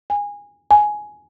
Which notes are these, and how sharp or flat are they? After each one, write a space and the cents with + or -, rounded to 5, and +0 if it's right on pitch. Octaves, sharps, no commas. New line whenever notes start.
G#5 -20
G#5 +10